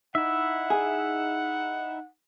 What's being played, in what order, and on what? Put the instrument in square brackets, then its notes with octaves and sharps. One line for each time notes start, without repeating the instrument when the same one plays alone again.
[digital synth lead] D#4 [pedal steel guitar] E4 E5 [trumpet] F#5
[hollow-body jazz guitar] G#4